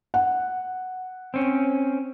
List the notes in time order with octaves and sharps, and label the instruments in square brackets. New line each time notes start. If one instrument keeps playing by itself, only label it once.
[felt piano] F#5
[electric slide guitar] C4 C#4